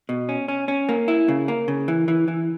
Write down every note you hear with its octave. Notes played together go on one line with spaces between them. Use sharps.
B2
C#4
C#4
C#4
A#3
E4
C#3
A#3
C#3
E3
E3
E3